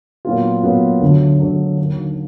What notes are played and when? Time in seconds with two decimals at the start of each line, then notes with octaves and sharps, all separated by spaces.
0.25 A#2 F#3 B3 F4
0.63 A#2 F#3 B3 F4
1.01 D2 D3 F#3
1.40 D2 D3 F#3
1.78 D#2 D3 F#3